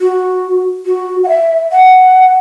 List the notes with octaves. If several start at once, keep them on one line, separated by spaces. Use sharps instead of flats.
F#4
F#4
F#5
E5
F#5